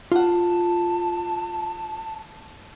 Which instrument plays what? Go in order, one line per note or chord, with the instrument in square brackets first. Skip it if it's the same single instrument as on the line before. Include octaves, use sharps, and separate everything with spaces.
[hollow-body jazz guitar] F4 F#5 [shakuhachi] A5